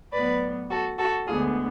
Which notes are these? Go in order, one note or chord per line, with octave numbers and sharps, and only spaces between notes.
A2 F#3 B3 B4 D5
F#4 A4
F#4 A4
D2 D3 G#3 B3 F4 G#4